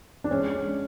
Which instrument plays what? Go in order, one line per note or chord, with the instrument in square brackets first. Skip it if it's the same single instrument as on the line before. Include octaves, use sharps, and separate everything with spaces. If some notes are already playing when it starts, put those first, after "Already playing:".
[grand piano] D4
G#3 C#4
G#3